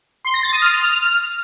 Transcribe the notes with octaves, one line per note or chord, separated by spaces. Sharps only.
C6
A#6
A6
D#6
F6